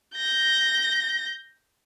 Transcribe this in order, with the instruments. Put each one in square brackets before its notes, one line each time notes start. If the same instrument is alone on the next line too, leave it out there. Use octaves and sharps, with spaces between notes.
[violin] G6 A#6